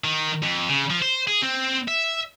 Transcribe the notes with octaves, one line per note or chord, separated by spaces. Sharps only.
D#3
F2
C#3
F3
C5
G#4
C4
E5